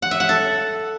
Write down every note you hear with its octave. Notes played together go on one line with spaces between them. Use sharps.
F#5
E5
F#5
A4